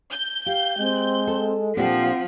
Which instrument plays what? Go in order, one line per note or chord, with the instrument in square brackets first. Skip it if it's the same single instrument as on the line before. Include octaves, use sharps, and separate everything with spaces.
[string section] G6
[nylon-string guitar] G4 [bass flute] F5
[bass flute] G#3 [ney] C4
[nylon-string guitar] A4
[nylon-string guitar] A#2 D4 G4 [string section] F3 [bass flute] C4 [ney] F#5